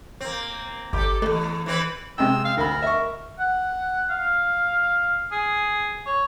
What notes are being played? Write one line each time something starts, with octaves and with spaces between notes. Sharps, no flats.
A#3 C4
G1 G4 A4
E2 B2 A3
E3 C4 B4
C3 G#3 G5 E6
F5
D2 A#4 B5
E5 C#6
F#5
F5
G#4
C#5